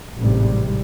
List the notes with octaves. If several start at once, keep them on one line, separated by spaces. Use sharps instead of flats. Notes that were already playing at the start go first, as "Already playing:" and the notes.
A1 G#2 C3 G3